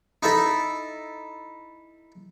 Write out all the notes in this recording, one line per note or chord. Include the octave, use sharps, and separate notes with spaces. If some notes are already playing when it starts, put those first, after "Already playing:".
D#4 E4 A4